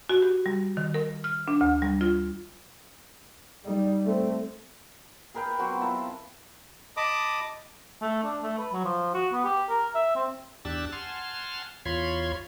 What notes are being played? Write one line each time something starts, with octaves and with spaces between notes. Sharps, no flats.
F#4
G4
G3
D#3
A#4
F6
D4
D2
G3
F4
G3 D#4
A3 C4
G#4 A#4 B4 G5
F#3 B3 C4 F#4
E4 F4 A5 A#5
D#5 A5 B5 D6 D#6
A3
D4
A3
B4
F#3
F3
F#4
B3
G4
A#4
E5
C4
E2 D4 G4 E6 F#6 A6
F#5 G#5 A5 C6 F6
E2 F4 C#5 B5 C6 G#6